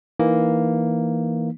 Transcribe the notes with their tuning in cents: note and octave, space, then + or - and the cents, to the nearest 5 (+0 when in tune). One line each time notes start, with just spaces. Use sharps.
E3 +0 A#3 +0 D#4 +0